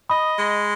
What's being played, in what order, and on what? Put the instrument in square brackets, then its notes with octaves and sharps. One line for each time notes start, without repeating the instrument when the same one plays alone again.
[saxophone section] D#5 [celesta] B5 D#6
[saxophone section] G#3